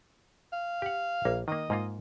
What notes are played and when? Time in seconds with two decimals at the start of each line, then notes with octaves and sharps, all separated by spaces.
0.52 F5
0.82 G4 F#5
1.25 A#1 A#3
1.48 D#3 A#3 D#5
1.70 G#2 A#3 F4